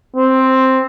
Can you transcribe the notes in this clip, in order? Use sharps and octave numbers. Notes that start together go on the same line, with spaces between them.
C4